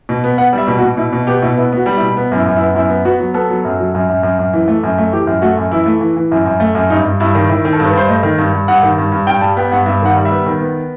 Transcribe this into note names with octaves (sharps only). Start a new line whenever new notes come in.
B2
B3
B3 F#5
G3 E5
B2
F#4
B2
B2 E4
B2
B3 G4
B2 E4
B3 E4
B3 F#4
G3
E4
B2
B3
F#2 E4
F#2
E4
B3
F#2 E4
B3
B3 F#4
F#3
B3 A4
F#3
F#2
F#3
F#2
F#2
F#2
F#2
E3
A3
F#2
A3
E3 G4
F#2
A3 F#4
F#2
E3 E4
A3
E3
E3
F#2 E4
F#2
A3
F#2
G2 D#4
G2
G2 E4
D#3
D#3 E4
D#3
A4
G2
B4
G2 C5
A3 D#5
D#3
G2
G2
G2 F#5
D#3
G2
G2
G2 G5
G3 A5
B3 G5
G2 F#5
G2 E5
D#3 F#5
G3
E5
B3
D#3
B3